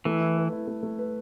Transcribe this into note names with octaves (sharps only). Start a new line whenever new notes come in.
E3 A3
E4
B4
E4
A3
A3
B4